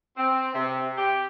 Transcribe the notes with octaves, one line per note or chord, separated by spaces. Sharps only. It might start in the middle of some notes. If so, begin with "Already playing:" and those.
C4
C3
G4